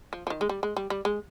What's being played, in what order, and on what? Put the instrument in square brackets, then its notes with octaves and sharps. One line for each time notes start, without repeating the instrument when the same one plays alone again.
[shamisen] F3
F3
D#3
G#3
G3
G#3
G3
G3
G#3